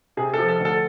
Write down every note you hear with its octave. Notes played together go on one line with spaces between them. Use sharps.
C3 G#4
F3 A4
A4
D2
A4